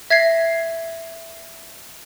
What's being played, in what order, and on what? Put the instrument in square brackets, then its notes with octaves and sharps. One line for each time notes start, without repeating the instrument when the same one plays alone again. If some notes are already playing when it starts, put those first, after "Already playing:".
[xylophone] E5 G#6 A#6 C7